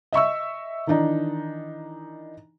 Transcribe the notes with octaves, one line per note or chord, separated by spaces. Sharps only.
D#5 E5 C#6 E6
D#3 E3 D4 D#4